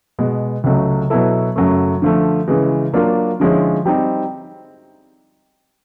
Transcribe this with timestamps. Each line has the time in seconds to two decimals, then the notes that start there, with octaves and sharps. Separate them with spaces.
0.19 B2 G#3 B3
0.64 C#2 C#3 F#3 A3
1.10 B2 F#3 B3 E4 A4
1.56 F#2 C#3 F#3 A3
2.02 D3 F3 A3
2.48 C#3 E3 G#3
2.93 F#3 A#3 D4 F4
3.40 D3 F3 G#3 C#4 E4
3.85 G3 C4 D#4